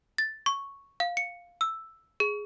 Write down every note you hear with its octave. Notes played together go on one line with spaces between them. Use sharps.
A6
C#6
F5
C#7
E6
G#4